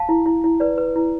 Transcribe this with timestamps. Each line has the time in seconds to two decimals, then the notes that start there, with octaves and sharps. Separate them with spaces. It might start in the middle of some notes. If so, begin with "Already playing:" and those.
Already playing: F5 A5
0.09 E4
0.26 E4
0.44 E4
0.60 B4 D5
0.78 B4
0.96 E4